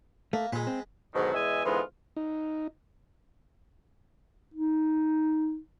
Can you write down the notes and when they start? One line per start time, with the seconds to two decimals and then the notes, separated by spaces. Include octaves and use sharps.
0.33 A3 A#3
0.52 A#2 G#3 B4
0.67 C4
1.14 G#2 B2 D3 D#3 F#3
1.34 E2 G#3 D#5 E5 G#5
1.65 G#2 D3 E3 G#3 B3 F4
2.17 D#4
4.54 D#4